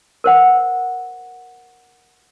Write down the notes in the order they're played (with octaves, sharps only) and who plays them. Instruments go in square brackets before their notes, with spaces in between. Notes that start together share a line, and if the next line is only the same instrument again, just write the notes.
[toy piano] A#4 C5 F#5